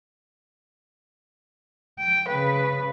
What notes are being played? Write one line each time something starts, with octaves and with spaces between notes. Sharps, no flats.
G5
C#3 B4